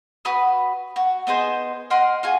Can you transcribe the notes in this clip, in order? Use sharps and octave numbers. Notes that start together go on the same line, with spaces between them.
F#4 B4 B5 D#6
F#4
B3 D#4 G#4 C5
A#4 D#5 F#5 C6
F4 F#4 G#4